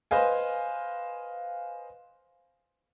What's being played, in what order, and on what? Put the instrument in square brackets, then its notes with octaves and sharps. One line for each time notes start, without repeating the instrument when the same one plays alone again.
[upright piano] B4 C5 D#5 F5 G#5